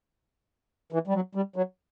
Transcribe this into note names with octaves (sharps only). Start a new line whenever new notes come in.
E3
G3
F#3
G3
F#3